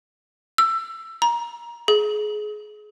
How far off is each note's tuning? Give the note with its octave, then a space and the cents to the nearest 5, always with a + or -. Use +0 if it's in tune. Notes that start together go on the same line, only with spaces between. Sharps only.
E6 +20
A#5 +20
G#4 +25